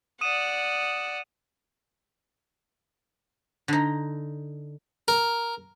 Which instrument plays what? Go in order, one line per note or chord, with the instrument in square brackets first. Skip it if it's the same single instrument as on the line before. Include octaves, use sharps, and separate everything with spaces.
[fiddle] D5 F#5 [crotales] D#6 D#7 E7
[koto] D3 D#4
[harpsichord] A#4